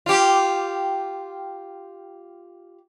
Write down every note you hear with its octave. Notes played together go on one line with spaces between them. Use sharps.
F4 G4